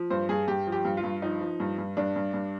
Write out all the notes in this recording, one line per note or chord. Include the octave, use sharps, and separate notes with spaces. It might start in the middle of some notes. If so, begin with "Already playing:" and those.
Already playing: F3
G2 C5
G2 G#4
G2 G4
F3
G4
G2
F4
G2
F3 D#4
F3
G2
G2
G2 D4
G2
G2